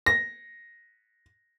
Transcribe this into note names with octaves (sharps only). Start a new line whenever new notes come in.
A#6